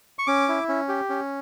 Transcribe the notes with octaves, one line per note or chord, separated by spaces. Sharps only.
C#6
C#4 D6
E4
C#4
G4
C#4